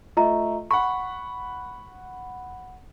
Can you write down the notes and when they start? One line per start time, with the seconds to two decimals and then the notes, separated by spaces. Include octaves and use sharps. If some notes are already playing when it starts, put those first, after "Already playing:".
0.17 A3 F4 D#5 A#5
0.71 F#5 B5 C#6